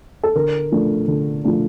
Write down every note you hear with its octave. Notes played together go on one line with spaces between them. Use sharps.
A4
D3 A#4
F3 A3 D4
D3
F3 A3 D4